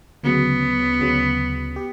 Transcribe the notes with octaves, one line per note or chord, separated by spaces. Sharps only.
D2 C#3 F#3 B3
D2 C#3 F#3
G4